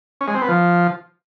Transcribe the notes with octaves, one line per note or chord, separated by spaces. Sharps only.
C#4
G#3
C4
B3
F3